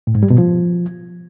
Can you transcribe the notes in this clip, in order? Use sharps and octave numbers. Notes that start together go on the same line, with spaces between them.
A2
G#2
G3
B2
F3